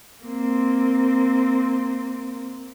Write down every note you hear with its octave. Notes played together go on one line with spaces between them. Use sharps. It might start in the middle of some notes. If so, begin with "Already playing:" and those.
A#3 C4